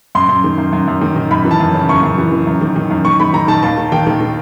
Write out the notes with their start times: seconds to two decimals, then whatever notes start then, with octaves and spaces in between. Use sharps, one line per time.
0.15 F#2 C6
0.29 F#2
0.44 D#3
0.58 F#2
0.73 F#2
0.88 F#2
1.02 D#3
1.16 D#3
1.31 F#2 B5
1.45 E3
1.51 A5
1.60 F#2
1.75 C#3
1.89 F#2 C#6
2.03 F#2
2.18 E3
2.32 E3
2.47 F#2
2.61 D#3
2.76 D#3
2.91 F#2
3.05 D#3 C#6
3.20 D#3 B5
3.34 D#3 A#5
3.48 D#3 A5
3.62 D#2 A5
3.78 D#3
3.92 D#3 G5
4.07 D#3
4.21 D#3